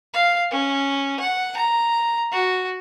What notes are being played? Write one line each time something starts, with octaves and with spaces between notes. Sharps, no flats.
F5
C#4
F#5
A#5
F#4